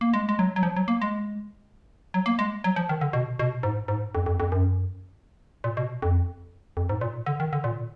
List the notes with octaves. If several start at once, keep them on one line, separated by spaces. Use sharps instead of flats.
A#3
G#3
G#3
F#3
F#3
F3
F#3
A#3
G#3
F#3
A#3
G#3
F#3
F3
D#3
D3
B2
B2
G#2
G#2
F2
F2
F2
F#2
A#2
B2
F2
F2
G#2
A#2
D3
D#3
D3
A#2